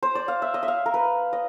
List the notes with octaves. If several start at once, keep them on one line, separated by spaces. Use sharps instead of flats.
C5
D5
F5
E5
D#5
E5
F5
A#4
B4
D#5